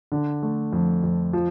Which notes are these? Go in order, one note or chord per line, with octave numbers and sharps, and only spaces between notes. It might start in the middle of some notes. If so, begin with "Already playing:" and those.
D3
A3
F2
F2
F3